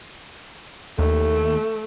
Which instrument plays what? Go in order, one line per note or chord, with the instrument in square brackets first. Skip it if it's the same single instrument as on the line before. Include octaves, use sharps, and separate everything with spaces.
[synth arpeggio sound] D#2 [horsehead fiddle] A3